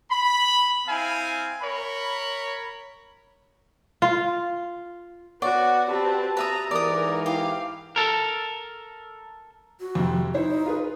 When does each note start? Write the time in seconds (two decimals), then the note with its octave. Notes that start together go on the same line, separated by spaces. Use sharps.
0.11 B5
0.87 C4 E4 F5 G#5
1.61 A#4 C#5 B5
4.02 F4
5.42 B3 F#4 C#5 D5 F#5 C#6
5.90 C4 F#4 G4 B4 A5
6.37 B4 E5 A#5 D#6
6.71 G#2 E3 A#4 D5 D#6
7.26 E4 G4 F5
7.96 A4 A#4
9.80 F#4
9.95 F2 C3
10.34 D#4 E4 C5 C#5
10.66 F4 G#4 B4